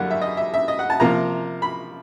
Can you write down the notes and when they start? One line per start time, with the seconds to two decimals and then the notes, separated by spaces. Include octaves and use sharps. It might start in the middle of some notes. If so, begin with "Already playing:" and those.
Already playing: F#2 D3 G3 A#3 F#5
0.10 E5
0.21 D#5
0.37 E5
0.54 E5
0.68 D#5
0.79 F#5
0.90 A5
1.00 C3 F3 A#3 A#5
1.62 B5